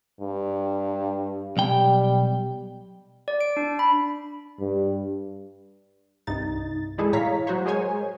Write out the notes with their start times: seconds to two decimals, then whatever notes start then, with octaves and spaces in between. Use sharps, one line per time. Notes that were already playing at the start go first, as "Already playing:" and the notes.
0.20 G2
1.57 B1 G3 G5
3.28 D5
3.41 D7
3.57 D4
3.79 B5
4.59 G2
6.27 C2 G2 D#4 A6
6.98 E3 G3 G#3 E4 G#4 A4
7.13 A2 C#5 F5 A#5 B6
7.47 F#3 F#4 C5 C#5
7.66 G#3 G#4 A#4 C5 C#5 G#5